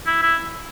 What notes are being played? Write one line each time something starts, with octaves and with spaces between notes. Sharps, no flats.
E4
E4